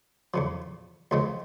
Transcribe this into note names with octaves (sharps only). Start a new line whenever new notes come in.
E2 C#3 F3
C#2 C#3 F3 G#3